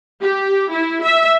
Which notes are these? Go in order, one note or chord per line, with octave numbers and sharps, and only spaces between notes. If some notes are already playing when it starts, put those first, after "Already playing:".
G4
E4
E5